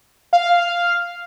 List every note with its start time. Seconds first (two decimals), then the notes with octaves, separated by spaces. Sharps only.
0.33 F5